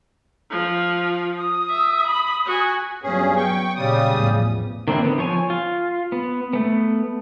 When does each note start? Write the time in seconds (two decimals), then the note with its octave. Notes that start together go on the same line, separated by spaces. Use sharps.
0.50 F3
1.37 D#6
1.69 E5
2.07 B5
2.46 F#4 G#5
3.03 G2 F#3 B3 C#4 G#4
3.37 G5 C#6
3.76 A#2 C#3 G3 D#6
4.13 A1 E2 F3
4.88 D#3 A#3 C4 D4 E4
5.02 D3 B3
5.18 F3 C#5 G#5
5.50 F4
6.12 B3
6.53 A3 B3